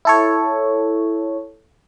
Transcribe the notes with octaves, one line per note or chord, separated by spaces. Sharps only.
E4 A4 C#5